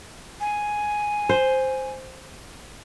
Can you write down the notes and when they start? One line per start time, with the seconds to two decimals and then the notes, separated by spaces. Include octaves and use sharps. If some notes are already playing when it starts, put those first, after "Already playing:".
0.40 G#5
1.29 C5